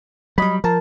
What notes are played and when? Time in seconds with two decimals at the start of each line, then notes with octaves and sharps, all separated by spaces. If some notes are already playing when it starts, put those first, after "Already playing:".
0.38 F#3 G3 D#5 B5
0.64 F3 A#4 A5